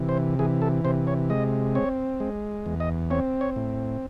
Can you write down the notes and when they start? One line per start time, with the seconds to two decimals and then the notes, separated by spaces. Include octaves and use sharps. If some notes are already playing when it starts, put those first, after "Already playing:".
Already playing: C3 E3
0.09 C5
0.39 E3 G#4
0.62 A4
0.84 C3 C5
1.07 C#5
1.30 G#3 D#5
1.75 C4 C#5
2.20 G#3
2.66 E2
2.80 D#5
3.11 C4 C#5
3.41 C#5
3.56 A2